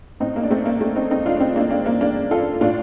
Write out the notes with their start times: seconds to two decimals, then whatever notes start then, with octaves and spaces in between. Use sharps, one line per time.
0.20 A2 C4 D#4
0.36 A#3
0.43 D4
0.50 A3 C4
0.65 A#3
0.81 A3
0.96 C4 D#4
1.11 C4 D#4
1.26 D4 F4
1.36 D4
1.40 C4 D#4
1.56 A#3 D4
1.71 A#3 D4
1.86 A#3
2.01 A#3 D4
2.31 F4 A4
2.61 A2 D4 F4